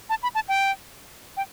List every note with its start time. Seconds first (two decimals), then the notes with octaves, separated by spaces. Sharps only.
0.10 A5
0.23 B5
0.35 A5
0.48 G5
1.37 G5